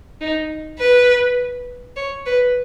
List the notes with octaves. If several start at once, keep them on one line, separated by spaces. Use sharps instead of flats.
D#4
B4
C#5
B4